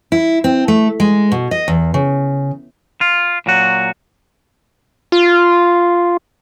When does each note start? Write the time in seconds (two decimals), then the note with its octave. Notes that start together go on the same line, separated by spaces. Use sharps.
0.12 E4
0.44 C4
0.68 A3
1.00 G#3
1.32 B2
1.51 D#5
1.68 E2
1.94 C#3
3.01 F4
3.46 A#2 F#3 F#4
5.12 F4